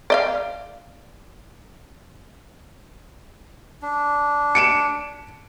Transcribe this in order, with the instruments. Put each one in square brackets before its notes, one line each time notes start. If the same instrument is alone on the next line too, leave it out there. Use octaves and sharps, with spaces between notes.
[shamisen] D5 D#5 F5
[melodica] D4
[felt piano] C#7 D7 E7